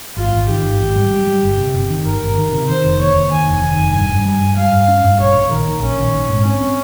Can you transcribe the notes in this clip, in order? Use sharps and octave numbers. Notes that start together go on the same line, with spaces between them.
G#1 F4
G#1
D#3 G4
G#1
G#1
G3
G3
G3
G1
C3
G1
D#3
G1 A#4
G1
D#3
C3
D#3 C5
F1
D#2 C#5
D#2
D#3 G#5
F1
D#3
F1
G2 G#5
G2
G3
G2
G3 F5
G2
C#4
G2
A#1 C#5
A#1
D#3 A#4
A#1
A#1 C#4
D#3
A#1
G#2
C4 C#4
C4